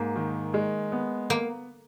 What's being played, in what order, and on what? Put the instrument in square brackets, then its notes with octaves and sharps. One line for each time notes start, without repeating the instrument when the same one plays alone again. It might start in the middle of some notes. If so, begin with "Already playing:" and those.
Already playing: [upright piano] G#2 [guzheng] A#3
[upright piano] D#3
G#3
B3
[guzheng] A#3